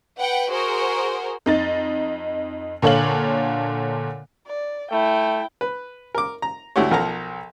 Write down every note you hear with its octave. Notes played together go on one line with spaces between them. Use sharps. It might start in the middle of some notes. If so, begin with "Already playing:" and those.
B4 F#5 G5
F#4 G#4 A#4 C5
F2 D#4 A6
A#2 D3 A4 C#5 F5 F#7
D5
A3 E4 G5
B4
A#4 D6
A#5
D2 A3 E4 F#4 G4 C#5
B1 F3 A#4 F#5 A5 A#5